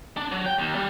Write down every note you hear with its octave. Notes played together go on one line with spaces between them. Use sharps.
D4
F#3
G5
D#2
G3